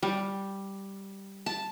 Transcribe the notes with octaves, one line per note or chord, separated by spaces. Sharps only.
G3
A5